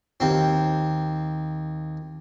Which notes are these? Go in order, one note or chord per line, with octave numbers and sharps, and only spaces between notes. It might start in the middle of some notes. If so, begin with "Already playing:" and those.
D#2 C4